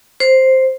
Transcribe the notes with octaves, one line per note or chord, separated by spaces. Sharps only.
C5